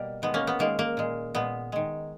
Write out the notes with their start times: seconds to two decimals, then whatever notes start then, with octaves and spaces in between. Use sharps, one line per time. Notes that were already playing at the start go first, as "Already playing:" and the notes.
Already playing: B2 G3 A#3
0.22 D#3 G#3 B3
0.34 A#3 C#4
0.47 B3
0.59 D#3 G#3 A#3
0.79 A#3
0.97 A#2 G#3
1.35 A#2 G#3 B3
1.72 D#3 G#3